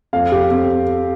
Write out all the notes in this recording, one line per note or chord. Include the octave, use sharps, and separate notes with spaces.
F2 F5
G4
C4